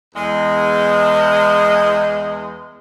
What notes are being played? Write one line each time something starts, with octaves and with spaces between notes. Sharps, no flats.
E2 G#3